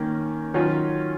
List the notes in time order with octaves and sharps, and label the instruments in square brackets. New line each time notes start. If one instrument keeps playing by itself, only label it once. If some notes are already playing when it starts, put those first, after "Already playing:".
Already playing: [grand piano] D#3 A#3 C#4
D#3 F#3 C#4 F4